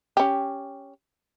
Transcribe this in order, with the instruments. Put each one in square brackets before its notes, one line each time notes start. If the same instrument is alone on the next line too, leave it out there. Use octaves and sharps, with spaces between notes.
[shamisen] C#4 G4